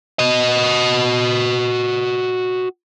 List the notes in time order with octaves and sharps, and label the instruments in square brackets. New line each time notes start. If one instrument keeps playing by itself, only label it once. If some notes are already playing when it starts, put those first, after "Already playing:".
[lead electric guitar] F#4 D#5